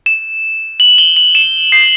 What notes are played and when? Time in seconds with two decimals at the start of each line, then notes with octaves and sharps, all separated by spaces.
0.06 E7
0.80 F#7
0.98 G7
1.17 F#7
1.35 E7
1.72 C7